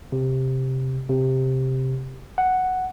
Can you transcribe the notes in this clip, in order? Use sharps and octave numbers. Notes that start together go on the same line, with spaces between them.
C3
C3
F#5